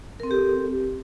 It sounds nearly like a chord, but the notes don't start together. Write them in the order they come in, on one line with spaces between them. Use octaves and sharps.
A#4 C4 A4 G4